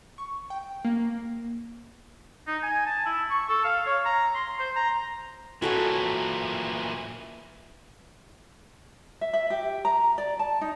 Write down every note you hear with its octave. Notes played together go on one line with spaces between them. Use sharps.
C#6
G5
A#3
D#4
G#5
A5
E4
C#6
A4
F5
C#5
A#5
C6
C5
A#5
A#2 E3 F#4 A4 C#5
E5
E5
G4
A#5
D5
A5
D#4